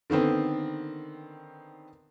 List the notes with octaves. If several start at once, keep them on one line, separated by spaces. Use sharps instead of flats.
D3 D#3 B3 C4